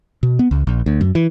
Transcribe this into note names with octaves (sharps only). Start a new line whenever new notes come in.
B2
B3
C#2
A#1
D2
F#2
E3